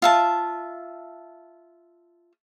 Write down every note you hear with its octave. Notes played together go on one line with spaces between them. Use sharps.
F4 E5 A5